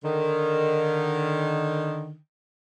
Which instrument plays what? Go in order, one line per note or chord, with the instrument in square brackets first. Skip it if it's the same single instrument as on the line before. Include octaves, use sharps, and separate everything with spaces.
[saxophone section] D3 D#3